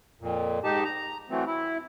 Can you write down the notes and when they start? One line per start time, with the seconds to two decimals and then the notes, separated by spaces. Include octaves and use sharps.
0.21 F2 A#2
0.64 G#2 D#4 G4 A5
0.85 A#5
1.30 E3 F#3 A3 C4
1.47 E4